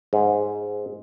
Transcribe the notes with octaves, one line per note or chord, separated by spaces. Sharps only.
G#2